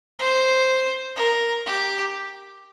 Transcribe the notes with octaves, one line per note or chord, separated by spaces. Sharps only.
C5
A#4
G4